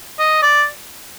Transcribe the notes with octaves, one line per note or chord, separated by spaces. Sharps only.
D#5
D5